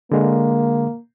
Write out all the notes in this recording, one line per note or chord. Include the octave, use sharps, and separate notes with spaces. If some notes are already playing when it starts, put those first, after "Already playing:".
D3 G#3 A#3